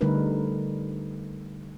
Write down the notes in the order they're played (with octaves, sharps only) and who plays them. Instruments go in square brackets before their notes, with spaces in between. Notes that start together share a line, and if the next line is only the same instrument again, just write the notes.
[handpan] D3 G3 A3 D#4 A#4 B4